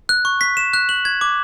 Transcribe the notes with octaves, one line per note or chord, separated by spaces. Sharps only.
F#6
C#6
B6
E7
F#6
F#7
G#6
D6